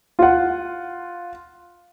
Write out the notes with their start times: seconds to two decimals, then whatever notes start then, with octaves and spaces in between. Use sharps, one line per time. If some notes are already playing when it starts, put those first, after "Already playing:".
0.19 F4 F#5